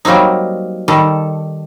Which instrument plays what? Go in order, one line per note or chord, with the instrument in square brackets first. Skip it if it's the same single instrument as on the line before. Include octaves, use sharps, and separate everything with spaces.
[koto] F#3 G3 A#3 C4 D#4
D#3 G3 A4